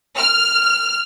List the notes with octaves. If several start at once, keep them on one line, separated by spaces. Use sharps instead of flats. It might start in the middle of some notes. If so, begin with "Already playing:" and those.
F6